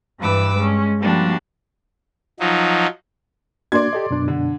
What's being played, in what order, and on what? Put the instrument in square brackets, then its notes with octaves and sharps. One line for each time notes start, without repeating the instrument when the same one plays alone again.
[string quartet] G2 E3 B4 D6 E6
G#3 C#4
F3 G3 A#3 D4 F#4
[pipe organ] F3 F#3 D#4
[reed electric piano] A#3 D4 F#4 [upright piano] D5 C6 G#6
[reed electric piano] G4 A4 D#5
F#2 B2 D4
[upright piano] D3